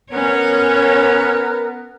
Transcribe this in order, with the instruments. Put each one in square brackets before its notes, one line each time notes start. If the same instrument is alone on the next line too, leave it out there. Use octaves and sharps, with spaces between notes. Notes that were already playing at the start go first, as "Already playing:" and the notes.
[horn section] B3 A#4 [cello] C#4 C#5